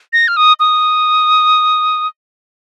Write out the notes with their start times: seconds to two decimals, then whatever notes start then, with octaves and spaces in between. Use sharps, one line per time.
0.13 A#6
0.28 F6
0.37 D#6
0.60 D#6